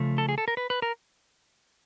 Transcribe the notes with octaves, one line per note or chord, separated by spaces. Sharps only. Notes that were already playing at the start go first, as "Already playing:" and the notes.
Already playing: C#3 F3 A3
A4
G#4
A4
A#4
B4
B4
A#4